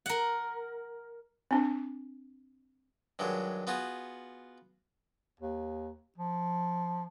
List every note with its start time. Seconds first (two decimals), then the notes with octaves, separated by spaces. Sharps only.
0.06 A#4 F#5
1.51 C4 D4
3.19 G2 D#3 F#3 G#3
3.67 B3 F4 F#4 G#4
5.40 D#2
6.18 F3